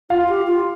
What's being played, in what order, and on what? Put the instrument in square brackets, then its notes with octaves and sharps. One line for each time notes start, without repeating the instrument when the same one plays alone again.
[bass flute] F4 [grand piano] F5
[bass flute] G4
F4